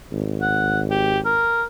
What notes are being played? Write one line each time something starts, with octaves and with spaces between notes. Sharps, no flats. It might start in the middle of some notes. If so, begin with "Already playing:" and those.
G#1
F#5
G4
A#4